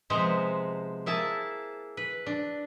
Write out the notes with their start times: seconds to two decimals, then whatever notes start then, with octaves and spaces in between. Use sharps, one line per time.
0.10 C3 F3 G#3 B3 C5 A#5
1.06 A#3 E4 G#4 A5
1.97 B4
2.26 D4